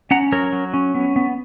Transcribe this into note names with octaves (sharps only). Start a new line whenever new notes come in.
C#4 F#5 A#5
F#3 A#4 C#5
F#3
C#4
B3
B3